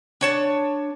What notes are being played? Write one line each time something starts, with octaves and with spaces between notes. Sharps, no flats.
D4 C#5 A5